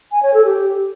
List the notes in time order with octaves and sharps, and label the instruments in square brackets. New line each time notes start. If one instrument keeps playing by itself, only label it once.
[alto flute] G#5
C#5
A4
G4